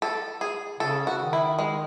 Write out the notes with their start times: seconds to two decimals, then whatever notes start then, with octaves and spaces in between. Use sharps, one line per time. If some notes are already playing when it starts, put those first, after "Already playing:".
0.02 A4
0.41 G#4
0.80 C#3 A4
1.07 F#4
1.19 D#3
1.33 E4
1.59 G#3